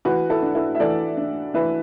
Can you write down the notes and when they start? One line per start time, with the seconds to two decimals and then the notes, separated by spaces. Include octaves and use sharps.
0.05 E3 F#4 B4
0.30 E4 A4
0.42 D4
0.55 E4 A4
0.75 E5
0.80 E3 A4 D5
1.17 D4
1.54 E3 B4 E5